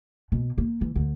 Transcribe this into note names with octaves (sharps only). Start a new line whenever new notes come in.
B2
A#3
E3
D2